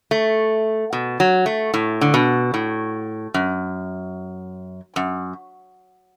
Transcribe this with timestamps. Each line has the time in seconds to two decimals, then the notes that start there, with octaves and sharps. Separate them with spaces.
0.11 A3
0.93 B2
1.20 F#3
1.46 A3
1.74 A2
2.01 D3
2.14 B2
2.54 A2
3.34 F#2
4.96 F#2